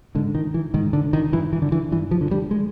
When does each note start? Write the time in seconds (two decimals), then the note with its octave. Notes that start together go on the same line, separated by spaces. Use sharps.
0.15 G#2 D3
0.35 D#3
0.54 E3
0.74 G#2 D#3
0.93 D3
1.13 D#3
1.32 G2 E3
1.53 E3
1.62 D3
1.72 E3
1.91 G2 E3
2.11 F3
2.21 D3
2.31 G3
2.51 G#3